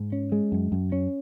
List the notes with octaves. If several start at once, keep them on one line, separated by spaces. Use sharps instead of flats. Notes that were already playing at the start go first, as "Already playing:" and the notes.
Already playing: G#2
C#4
G#3
F#2
F#2
C#4